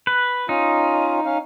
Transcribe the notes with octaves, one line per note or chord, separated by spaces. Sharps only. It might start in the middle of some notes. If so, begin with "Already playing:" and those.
B4
C#4 D#4 F4
C#4 F5